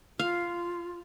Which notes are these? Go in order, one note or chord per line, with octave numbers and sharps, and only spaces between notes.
F4 F5